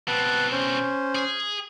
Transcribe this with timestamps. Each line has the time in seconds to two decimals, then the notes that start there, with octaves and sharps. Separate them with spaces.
0.08 B2 C4 B4 F#5 A5
0.52 C#4 C5
1.15 G#4